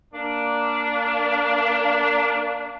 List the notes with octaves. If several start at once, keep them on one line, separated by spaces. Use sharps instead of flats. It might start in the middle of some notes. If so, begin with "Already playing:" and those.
A#3 D4